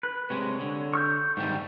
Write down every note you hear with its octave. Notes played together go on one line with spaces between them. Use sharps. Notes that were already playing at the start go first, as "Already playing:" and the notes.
B4
C3 G#3 C#5
D3
C#6 E6 G6
G#2 D#3 G3